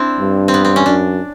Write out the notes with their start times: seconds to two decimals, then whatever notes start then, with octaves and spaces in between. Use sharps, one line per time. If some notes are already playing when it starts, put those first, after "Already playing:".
Already playing: C4 D4 E4
0.20 G2
0.48 C4
0.54 B3
0.65 C4
0.76 C#4
0.86 F#2 D4